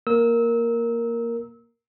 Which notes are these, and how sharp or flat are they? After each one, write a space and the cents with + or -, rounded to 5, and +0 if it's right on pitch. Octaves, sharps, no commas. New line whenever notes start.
A#3 +0 A#4 +0 E6 -25